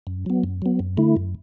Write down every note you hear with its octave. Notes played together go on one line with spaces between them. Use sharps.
F#2
F#3 B3
F#2
F#3 B3
F#2
D3 A3 E4
F#2